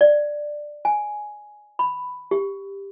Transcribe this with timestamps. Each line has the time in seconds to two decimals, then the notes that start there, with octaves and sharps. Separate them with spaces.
0.01 D5
0.85 G#5
1.79 B5
2.31 G4